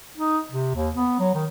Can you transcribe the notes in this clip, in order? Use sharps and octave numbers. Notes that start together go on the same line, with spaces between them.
D#4
C3
D#2
B3
F#3
D#3